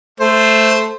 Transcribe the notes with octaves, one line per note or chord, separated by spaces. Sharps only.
A3 C5